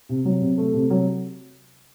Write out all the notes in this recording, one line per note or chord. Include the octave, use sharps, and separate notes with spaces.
C3
F#3
C3
A3
C3
F#3